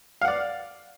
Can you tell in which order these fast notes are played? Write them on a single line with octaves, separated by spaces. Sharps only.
F5 F#5 D5